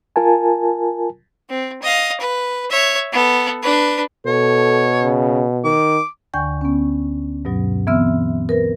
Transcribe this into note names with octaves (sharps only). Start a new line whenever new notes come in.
F4 A#4 G#5 A5
C4
D#5 F5
B4
C#5 E5
B3 A4
D4 B4
B2 A4 C#5
C#3
D#3 D6
D2 D3 G5 G#5 C#6 G6
B3 C#4
G2 B2 F#3
E3 B3 C4 E5 E6 F6
A#4 B4 A#6